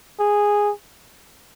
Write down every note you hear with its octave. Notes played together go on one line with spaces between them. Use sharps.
G#4